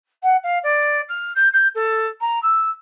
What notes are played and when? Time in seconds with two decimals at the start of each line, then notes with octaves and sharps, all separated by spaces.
0.23 F#5
0.43 F5
0.63 D5
1.08 F6
1.35 G6
1.53 G6
1.75 A4
2.20 A#5
2.42 E6